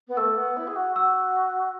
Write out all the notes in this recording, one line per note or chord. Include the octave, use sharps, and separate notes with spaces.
B3
A3 E6
B3
E4
G#4
F#4
F#4 E6